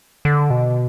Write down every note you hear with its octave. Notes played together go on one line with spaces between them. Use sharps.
D3
B2